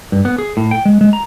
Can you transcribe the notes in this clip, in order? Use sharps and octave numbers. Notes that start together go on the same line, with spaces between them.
G2
B3
G#4
A2
G5
G#3
G#3
A#5